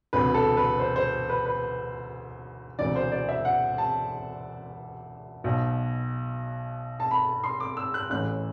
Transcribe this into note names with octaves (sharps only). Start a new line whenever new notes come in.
E1 D2 C3 B4
A4
B4
C5
C5
B4
B4
E1 D2 C3 E3 D5
C5
D5
E5
F#5
A5
B1 B2
A5
B5
C6
D6
E6
F#6
A1 A2 E3 F#6